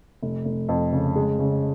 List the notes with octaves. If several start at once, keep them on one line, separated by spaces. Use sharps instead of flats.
F1
F1
F2
C#3
G#3
C#3